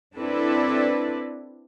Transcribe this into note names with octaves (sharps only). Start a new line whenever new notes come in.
C4 D4 E4 A4 B4 D5